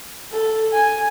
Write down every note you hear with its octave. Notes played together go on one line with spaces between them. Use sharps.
A4
G#5